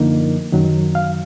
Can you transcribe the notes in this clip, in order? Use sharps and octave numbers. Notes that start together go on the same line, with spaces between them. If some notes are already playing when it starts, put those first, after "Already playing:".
Already playing: F#2 D3 F3 A#3 D#4
F#2 D#3 F#3
F5